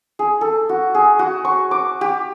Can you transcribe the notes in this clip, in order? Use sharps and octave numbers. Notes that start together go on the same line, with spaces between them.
G#4
A4
F#4
G#4
F#4
C#6
D6
G4